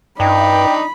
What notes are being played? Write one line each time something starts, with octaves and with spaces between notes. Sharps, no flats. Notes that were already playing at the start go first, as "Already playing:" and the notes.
G2 D4 D#4 G5 B5